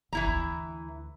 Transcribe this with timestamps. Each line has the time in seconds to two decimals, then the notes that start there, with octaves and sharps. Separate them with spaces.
0.13 G1 E3 E4 A#5
0.27 D2